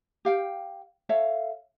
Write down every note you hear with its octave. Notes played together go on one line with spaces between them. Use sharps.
G4 F5 G5
A4 C#5 E5 F5